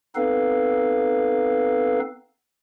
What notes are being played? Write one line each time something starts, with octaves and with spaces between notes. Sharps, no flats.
B3 C4 D#4 A4 B4 F5